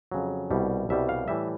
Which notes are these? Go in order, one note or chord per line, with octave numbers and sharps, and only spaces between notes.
F2 C#3 F#3
C2 B2 G3
C2 B2 G3 E5
F5
A2 E3 G3 E5